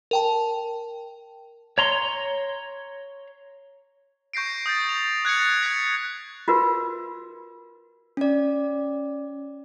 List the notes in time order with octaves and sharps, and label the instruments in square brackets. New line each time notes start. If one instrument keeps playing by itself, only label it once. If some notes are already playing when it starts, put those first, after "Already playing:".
[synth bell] A#4 G5 A5
[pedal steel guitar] C#5 A#5 C6
[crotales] C#6 G6 A#6 C7 D7
D#6 G6 A6
F7
F#6 G#6 A#6 C#7
G#6 B6
[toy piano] F4 F#4 A#4 B4
[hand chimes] C#4 D5